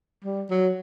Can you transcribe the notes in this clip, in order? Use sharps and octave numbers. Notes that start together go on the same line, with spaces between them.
G3
F#3